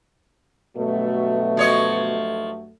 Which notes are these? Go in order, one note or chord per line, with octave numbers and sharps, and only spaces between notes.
G2 B2 F#3 A3
F3 C#5 D#5